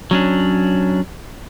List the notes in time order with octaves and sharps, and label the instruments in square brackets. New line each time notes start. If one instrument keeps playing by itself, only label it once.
[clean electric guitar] F#3 C#4 D4